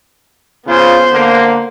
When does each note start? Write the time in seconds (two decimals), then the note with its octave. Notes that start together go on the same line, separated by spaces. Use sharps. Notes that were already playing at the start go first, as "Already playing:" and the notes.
0.67 C#3 B3 F4 C5
1.12 D3 A#3